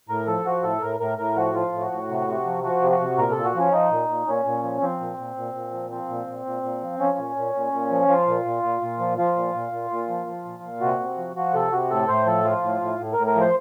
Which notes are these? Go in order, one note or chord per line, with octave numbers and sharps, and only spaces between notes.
A2 A#4
F3 A4
F3 F#4
A2 A4
A2 A#4
A2 A#4
A2 A#4
F3 F#4
F3 F4
A2
F#4
A2
C3
C3
F3
F3 F#4
C3
F#4
C3
A#2 A#4
A#2 A4
F#4
F3 C#4
F3 D#4
A#2
A#2
A#2 C#4
A#2
F3
F3 C4
A#2
A#2
A#2
A#2
F3
F3 C4
A#2
A#2
A#2
A#2
F3
F3 C#4
A#2
A#2
A#2
A#2
F3
F3 F4
A#2
A#2
A#2
A#2
F3
F3 F4
A#2
A#2
A#2
A#2
F3
F3
A#2
A#2
C3 F#4
C3
F3
F3 F#4
C3 A4
C3 F#4
A2 A4
A2 C5
F3 A4
F3 F4
A2
A2
A2
A2 A#4
A#4
F3
C5